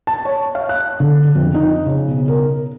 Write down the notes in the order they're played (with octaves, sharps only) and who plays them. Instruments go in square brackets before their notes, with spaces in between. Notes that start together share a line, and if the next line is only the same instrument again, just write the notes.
[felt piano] A5
C#5
F5
F#6
D3
F2
D#4
C#3
B2
A#4